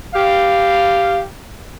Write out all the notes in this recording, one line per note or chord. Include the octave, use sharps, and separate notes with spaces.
G4 F5